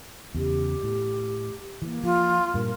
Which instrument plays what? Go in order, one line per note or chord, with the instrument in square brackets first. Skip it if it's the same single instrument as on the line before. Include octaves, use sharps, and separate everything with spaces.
[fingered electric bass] E2 C#3 [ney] G4
[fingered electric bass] A2
[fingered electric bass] E3 [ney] A#3
[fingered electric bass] F3 [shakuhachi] F4
[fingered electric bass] G2 A#2 [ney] A#4